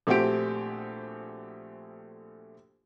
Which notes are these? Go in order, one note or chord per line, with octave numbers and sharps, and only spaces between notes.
A#1 A3 C4 F#4 G4 D7